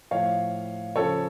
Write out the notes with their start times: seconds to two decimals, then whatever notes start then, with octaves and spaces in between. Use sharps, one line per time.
0.11 A2 F3 C#5 F5
0.96 C#3 F3 A4 C#5